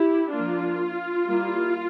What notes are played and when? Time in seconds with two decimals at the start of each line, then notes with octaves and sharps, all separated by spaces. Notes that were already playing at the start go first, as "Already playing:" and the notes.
Already playing: E4 G4
0.32 F3 A#3 D4 F4
1.26 G3 A#3 E4